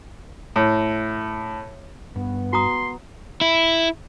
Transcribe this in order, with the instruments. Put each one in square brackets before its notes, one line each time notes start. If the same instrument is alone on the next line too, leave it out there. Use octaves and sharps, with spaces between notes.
[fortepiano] A2
[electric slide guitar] G2 [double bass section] B3
[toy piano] F#4 A#5 D#6 [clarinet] C6
[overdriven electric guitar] E4